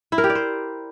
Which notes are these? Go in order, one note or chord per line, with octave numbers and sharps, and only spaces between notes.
E4
A#4
G4
D5
C5